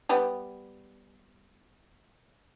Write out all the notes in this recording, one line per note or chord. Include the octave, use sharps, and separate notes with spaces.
G3 B3 G4